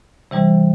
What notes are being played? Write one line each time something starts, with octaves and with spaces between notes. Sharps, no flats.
C3 E3 G3